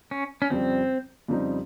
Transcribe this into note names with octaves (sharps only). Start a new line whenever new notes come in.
C#4
C#4
F2 C#3 G3 C4
F2 C#3 G3 C4 D#4